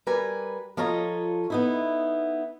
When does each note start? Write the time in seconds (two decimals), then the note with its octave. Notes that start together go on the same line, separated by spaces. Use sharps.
0.07 G3 A#4 B4 G#5
0.77 F3 F4 A4 C#5 D#5 A#5
1.50 B3 D#4 E4